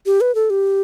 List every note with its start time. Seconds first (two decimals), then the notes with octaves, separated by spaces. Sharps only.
0.06 G4
0.21 B4
0.35 A4
0.50 G4